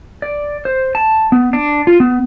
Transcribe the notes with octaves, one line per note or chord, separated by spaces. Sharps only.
D5
C5
A5
B3
D4
F4
B3